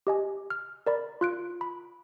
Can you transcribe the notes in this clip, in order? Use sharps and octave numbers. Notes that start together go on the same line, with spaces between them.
G4 D#5 G#5
F6
A#4 D5 B5
F4 F#6 D7
B5